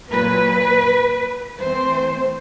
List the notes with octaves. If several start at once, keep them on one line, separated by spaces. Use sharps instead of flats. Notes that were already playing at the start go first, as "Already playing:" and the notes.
A#2 F#3 A#3 B4
E3 A3 C4 C5